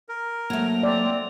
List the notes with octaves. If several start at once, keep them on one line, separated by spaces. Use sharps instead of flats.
A#4
F#3 A3 A#3
C4 D5
C4